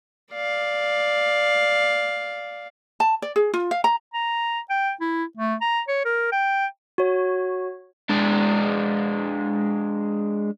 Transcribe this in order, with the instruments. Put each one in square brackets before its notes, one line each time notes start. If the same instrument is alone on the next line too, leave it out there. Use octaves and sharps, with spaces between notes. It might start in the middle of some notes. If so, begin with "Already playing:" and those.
[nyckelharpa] D5 F5
[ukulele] A5
D5
G#4
F4
F5
A#5
[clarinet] A#5
G5
E4
A3
A#5
C#5
A#4
G5
[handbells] F#4 C#5
[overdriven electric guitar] G#3 D4